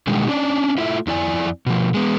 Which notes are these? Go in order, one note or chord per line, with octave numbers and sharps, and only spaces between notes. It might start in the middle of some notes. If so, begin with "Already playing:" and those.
B2 D3 D#3 G3 G#3
C#4 D4 D5
A3 E4 F4 E5
F2 E4 D5 G#5
B2 F3
G#3 B3